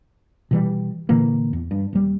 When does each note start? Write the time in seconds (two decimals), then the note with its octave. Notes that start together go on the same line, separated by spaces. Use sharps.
0.51 B2 E3 G3
1.09 A#2 D3 E3 A#3
1.53 E2
1.71 G2
1.93 D#1 G3